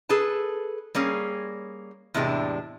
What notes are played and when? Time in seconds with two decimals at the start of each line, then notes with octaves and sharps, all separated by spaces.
0.09 G#4 A4 B4 A5
0.95 G3 A#3 C#4 G#4
2.14 E2 A2 C3 G#3 D4 G4